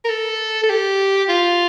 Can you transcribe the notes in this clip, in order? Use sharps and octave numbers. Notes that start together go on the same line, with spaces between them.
A#4
A4
A4
G4
F4